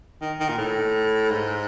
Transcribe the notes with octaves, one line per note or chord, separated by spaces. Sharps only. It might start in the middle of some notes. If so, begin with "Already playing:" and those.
D#3
D#3
A#2
A2
G#2